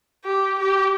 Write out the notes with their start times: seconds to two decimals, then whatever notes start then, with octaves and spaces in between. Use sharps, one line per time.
0.25 G4
0.60 G4